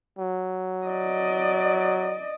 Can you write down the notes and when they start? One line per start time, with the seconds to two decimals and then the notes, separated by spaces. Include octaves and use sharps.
0.18 F#3
0.87 D5 D#5